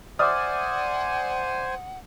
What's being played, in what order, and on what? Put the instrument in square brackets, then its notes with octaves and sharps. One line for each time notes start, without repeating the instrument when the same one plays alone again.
[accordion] C5 G#5 [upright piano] D5 E5 D#6 [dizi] F#5 [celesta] D6 F6